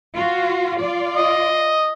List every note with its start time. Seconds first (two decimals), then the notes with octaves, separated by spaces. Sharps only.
0.14 F4 F#4
0.80 F4 D5
1.17 D#5